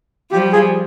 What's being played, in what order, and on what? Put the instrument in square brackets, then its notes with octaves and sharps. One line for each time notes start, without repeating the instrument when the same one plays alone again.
[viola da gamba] F3 G3 [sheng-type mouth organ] G4
[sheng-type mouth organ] G#4